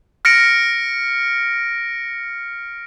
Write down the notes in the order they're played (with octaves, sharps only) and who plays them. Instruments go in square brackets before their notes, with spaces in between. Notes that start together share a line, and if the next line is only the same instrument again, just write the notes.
[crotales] F6 A#6 C#7 D7